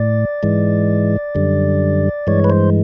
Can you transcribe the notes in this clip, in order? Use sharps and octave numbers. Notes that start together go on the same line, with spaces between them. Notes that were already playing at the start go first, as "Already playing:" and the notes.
Already playing: A2 D5
G#2 E3 G#3
F#2 D3 G3
G2 E3 G#3 C#5
B4
C5